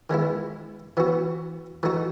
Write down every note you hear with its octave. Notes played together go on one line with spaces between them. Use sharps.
D#3 G#3 B3 E4
E3 B3 F#4
E3 A3 D#4 F#4